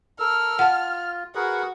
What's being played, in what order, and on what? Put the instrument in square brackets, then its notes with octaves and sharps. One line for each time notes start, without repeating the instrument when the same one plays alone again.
[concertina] A4 A#4 E6 [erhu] F6
[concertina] F4 [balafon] F#5 A5
[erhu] F#4 [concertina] G#4 A#4 B4